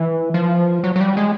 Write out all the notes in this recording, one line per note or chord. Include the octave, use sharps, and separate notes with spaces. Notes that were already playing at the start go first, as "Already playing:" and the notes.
Already playing: E3
F3
F#3
F#3
G3
G#3